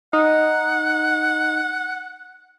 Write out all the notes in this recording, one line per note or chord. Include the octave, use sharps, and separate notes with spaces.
D#4 F#5